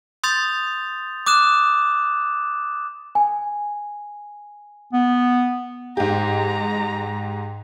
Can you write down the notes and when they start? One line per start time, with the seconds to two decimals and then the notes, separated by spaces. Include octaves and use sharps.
0.24 C6 D#6 G6 A6 F7
1.26 D6 D#6 F#6 E7
3.15 G#5
4.93 B3
5.97 G#2 G#3 G4 A#5